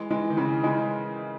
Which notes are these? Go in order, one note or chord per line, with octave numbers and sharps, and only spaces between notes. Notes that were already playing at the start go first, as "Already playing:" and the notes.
Already playing: E3 G#3
E3 G#3
D#3
C#3 E3
E3 G#3